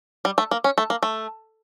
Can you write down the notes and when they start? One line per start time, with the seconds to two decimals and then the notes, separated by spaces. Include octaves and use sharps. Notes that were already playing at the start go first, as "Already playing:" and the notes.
0.25 G3
0.38 A3
0.51 A#3
0.64 C#4
0.78 A3
0.90 A#3
1.03 A3